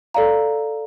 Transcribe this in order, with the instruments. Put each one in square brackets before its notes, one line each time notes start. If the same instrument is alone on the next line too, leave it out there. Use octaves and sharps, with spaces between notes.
[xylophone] A4 D5 F5 A#5